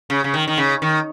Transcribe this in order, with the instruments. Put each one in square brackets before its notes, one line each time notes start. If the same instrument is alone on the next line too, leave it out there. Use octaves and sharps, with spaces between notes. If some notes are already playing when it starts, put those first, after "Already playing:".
[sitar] C#3
C#3
D#3
D#3
C#3
D#3